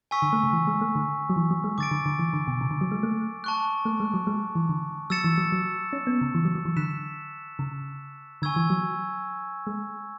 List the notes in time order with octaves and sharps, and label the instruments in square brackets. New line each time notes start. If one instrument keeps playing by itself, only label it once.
[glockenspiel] G#5 C#6 E6 B6
[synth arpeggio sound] D3
A3
C#3
E3
G#3
A3
D3
F#3
E3
F#3
G#3
[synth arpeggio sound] D3 [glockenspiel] D6 A6 D7
[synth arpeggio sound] D3
D3
E3
D3
B2
C#3
D3
F#3
G#3
A3
[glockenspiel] A5 C#6 F#6
[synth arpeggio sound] A3
G#3
F#3
G#3
E3
D3
[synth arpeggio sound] F#3 [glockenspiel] E6 A6 C#7 E7
[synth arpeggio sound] E3
F#3
F#3
C#4
B3
C#3
E3
F#3
F#3
E3
[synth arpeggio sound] D3 [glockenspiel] F#6 B6 E7
[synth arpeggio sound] C#3
[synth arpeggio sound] D3 [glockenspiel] G#5 C#6 E6 G#6
[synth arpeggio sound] E3
F#3
G#3